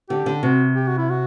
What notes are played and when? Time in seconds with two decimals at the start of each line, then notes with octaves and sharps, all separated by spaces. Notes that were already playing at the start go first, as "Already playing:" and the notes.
0.09 D3 G4
0.26 D3
0.42 C3 F#4
0.75 G4
0.87 F#4
0.98 E4
1.10 F#4